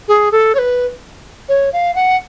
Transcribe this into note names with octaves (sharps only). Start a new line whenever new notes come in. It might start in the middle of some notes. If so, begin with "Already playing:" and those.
G#4
A4
C#5
B4
C#5
F5
F#5